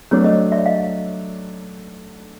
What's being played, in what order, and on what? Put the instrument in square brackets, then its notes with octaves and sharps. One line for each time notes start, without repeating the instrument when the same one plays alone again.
[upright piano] F#3 A3 D4 [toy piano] B4 C#5
[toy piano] C#5 D#5
D5 E5
D#5 F5